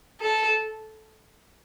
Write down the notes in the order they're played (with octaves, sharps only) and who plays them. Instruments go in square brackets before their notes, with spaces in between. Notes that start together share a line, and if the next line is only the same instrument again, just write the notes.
[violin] A4